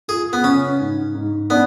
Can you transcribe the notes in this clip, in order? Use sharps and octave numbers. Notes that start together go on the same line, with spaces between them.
F4 G#4
B3
C#3 C#4
G#2
G#2
B3 D4